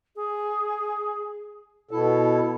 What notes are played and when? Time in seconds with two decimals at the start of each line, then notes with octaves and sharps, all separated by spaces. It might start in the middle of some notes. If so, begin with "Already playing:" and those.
0.16 G#4
1.91 B2 E4 A4